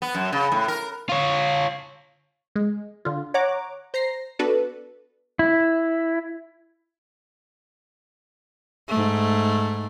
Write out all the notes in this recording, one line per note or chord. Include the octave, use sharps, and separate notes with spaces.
B3
F#2
C#3
A2
A#4
F4 C#5
G#3
D3 F4
C#5 F#5 A#5 D6
C5 A#5 A#6 C7
B3 D4 F#4 A4 B4
E4
G#2 A3